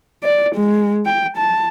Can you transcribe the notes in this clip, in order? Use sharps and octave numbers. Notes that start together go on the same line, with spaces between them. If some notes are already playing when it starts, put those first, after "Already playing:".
D5
G#3
G5
A5